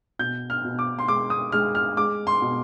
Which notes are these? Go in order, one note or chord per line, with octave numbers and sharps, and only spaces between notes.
B2 G6
F6
B2
D6
C6
G#3 D6
D#6
G#3 F6
F6
G#3 D6
C6
B2